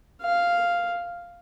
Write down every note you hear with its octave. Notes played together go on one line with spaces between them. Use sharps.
F5